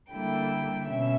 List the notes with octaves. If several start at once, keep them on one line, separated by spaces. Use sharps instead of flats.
D3 G3 A#3 E4 G5
B2 C#4 E5